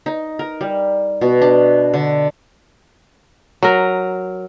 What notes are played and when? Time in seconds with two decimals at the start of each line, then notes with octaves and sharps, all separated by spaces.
0.06 D#4
0.39 A#4
0.61 G3
1.21 B2
1.41 D4
1.94 D3
3.63 F#3 A#4